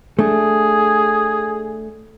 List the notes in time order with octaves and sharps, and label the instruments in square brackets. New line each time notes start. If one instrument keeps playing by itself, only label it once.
[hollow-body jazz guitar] A3 D4 [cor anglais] G#4